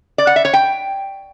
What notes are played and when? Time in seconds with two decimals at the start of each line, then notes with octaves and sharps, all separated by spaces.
0.18 D5
0.27 F#5
0.36 E5
0.45 C#5
0.54 G5